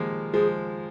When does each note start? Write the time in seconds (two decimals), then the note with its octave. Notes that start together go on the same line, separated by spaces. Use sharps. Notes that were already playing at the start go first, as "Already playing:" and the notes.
Already playing: D#3 F3 G3 G#3 A#3
0.33 F3 G#3 G#4